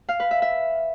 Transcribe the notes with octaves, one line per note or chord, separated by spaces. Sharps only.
F5
B4
E5
E5